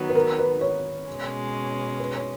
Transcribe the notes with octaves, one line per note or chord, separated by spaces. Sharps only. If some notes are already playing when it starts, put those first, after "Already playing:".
Already playing: D#3 F#3 B3
B4
A#4
B4
C#5
B2 G#3 C#4
B4
C#5